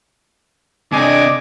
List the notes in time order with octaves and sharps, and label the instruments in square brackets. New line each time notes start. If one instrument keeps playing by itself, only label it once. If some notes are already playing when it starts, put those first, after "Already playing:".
[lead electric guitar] C3 D4 [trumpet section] D#5 G#5 D6